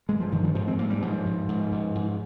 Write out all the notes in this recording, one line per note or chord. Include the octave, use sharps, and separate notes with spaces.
G2 G#3
F3
G2 D#3
F3
G#2 F3
C4
G#2 A#3
G3
G#2 F3
G#2
G#2
G#2
G#2